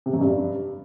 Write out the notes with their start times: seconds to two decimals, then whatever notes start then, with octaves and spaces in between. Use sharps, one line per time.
0.06 C3
0.14 F#2
0.21 G2